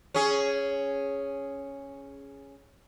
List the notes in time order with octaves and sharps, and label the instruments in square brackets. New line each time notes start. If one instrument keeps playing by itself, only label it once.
[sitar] C#4 G#4